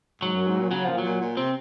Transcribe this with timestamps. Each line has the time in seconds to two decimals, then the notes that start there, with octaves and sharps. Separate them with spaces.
0.22 G#2 F#3
0.34 F#2
0.47 G#2
0.59 A#2
0.71 C#3 F#3
0.84 A#2 F3
0.98 F#3
1.05 A#2
1.21 A#2
1.37 C3 C4